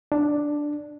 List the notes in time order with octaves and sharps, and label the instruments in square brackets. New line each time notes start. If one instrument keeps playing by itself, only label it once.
[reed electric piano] D4